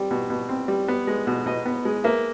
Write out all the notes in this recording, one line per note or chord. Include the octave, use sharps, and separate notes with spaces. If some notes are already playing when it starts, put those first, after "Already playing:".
Already playing: G3 C4 D5
B2
B2
C4
G3
B3
G#3
B2
B2 D#5
B3
G#3
A#3 E5